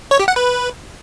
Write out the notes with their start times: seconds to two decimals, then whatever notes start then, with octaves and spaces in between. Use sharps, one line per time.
0.11 C#5
0.20 G4
0.28 F#5
0.36 B4